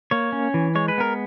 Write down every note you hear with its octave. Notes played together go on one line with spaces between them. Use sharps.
A#3 C#5
C#4
E3
G#3 C#5
B4
B3 A#4